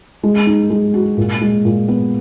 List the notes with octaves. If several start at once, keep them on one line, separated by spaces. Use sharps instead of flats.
G#3
D#4
G#3
F#4
A#2
G#3
A#2
B3